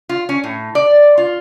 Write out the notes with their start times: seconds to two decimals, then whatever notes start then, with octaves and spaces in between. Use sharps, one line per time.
0.09 F4
0.29 C#4
0.44 A2
0.75 D5
1.18 F4